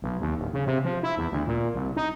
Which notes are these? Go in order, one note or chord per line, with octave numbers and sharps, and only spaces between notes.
B1
D#2
D1
C#3
C3
F3
E4
E2
D2
A#2
C2
D#4